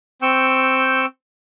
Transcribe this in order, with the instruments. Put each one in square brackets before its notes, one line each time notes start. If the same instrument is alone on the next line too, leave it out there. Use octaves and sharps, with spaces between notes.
[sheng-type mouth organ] C4 G5 C#6 E6 G6